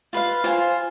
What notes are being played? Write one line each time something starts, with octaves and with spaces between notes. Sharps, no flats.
F4 B4 F5
F4 C5 F5 G#5